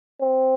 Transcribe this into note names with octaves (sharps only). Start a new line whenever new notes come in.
C4